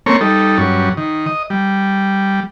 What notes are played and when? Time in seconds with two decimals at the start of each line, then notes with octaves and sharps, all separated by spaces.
0.06 A3 A#3 C4 C#4 C#5
0.21 G3 D#4 A4
0.58 G2 F#3 C#4
0.97 D#3
1.26 D#5
1.50 G3